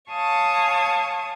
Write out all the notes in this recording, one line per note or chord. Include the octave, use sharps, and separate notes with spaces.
C#5 F5 G#5 A5 C#6 D#6